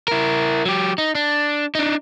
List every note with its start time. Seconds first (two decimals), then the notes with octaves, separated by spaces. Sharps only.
0.08 E4 A#4
0.66 F#3 G4
0.98 D#4
1.15 D4
1.75 D4 D#4